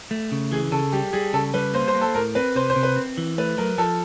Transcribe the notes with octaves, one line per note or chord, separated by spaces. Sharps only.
A3
C#3
E3 G#4
C#3 A4
G3 G4
G3 G#4
C#3 A4
G3 B4
A#3 C5
C5
A#3
A4
A2 A#4
C4 B4
C3 C5
C5
C3
B4
C4
E3
A3 B4
F#3 A#4
F3 A4